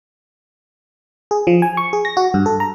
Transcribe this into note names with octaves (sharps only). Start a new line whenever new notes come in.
G#4
F3
G#5
C#6
G#4
A#6
F#4
G2
A4
A#5